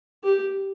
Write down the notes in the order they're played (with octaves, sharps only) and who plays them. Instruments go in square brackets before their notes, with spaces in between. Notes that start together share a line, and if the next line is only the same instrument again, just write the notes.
[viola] G4